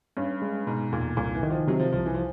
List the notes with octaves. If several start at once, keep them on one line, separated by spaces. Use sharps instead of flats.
G2 C#4
G#3
G#2 B2
E2 A#2
C2 A#2
E3
D#3
F3
C3 F#3
F3
C2 F3
E3
F3